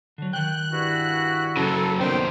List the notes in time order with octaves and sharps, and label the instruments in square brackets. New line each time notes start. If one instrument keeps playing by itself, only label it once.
[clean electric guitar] D3 F#3
[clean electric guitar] D#3 G5 [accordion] F#6
[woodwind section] G2 E4 F#4
[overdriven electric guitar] C#3 F#3 [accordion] A4
[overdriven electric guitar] D#2 C5 [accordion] D#3 G5 [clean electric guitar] G3 B3 C4